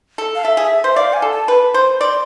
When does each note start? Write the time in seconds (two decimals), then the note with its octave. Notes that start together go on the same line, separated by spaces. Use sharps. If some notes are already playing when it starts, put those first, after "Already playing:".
0.18 A4
0.35 F5
0.44 A4 E5
0.57 G#4
0.84 C5
0.91 E5
0.96 D5 F5
1.13 G#5
1.22 A4
1.31 A5
1.48 B4
1.74 C5
2.00 D5 C6